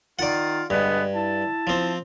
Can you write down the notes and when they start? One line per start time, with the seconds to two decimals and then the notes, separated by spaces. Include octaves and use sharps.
0.19 D#3 F4 D5 F#5
0.70 G2 D3 G#3 B3
1.15 E4 A5
1.67 F3 C4